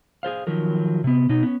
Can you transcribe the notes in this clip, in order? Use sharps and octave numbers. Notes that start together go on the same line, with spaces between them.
G#4 A4 C5 F5
D#3 F3 F#3 A#4
C3 B3
B2 D#4
B3 C#4